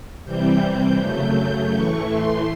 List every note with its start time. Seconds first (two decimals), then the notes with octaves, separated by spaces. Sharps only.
0.25 C3 E3 G3 C4 G6
0.99 F#2 C#3 F#3 A3 G6
1.73 A2 E3 A3 C#6
2.11 C6